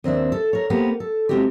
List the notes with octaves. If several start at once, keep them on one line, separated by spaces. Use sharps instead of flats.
D#2 C4 D4 E5
A4
A#4 C#5
A#3 B3 G4 C5
A4
G#3 B3 C4 E4 F#4 G4